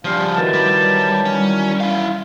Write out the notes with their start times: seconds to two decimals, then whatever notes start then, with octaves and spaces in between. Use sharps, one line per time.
0.05 C#3 F3 G3 D4 F5
0.35 D#3 E3 F#3 A5
0.54 G3
1.26 G3 C#4
1.80 E4 F5